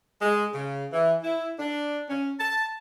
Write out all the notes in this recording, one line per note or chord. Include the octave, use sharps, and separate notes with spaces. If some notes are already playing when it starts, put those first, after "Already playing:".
G#3
C#3
E3
E4
D4
C#4
A5